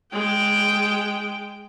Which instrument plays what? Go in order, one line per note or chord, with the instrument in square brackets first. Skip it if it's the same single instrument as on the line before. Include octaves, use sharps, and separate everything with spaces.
[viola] G#3 G5